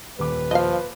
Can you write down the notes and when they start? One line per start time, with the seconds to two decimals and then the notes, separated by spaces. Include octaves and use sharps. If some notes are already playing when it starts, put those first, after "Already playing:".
0.19 D#1 B4 D6
0.51 F3 D#5 F5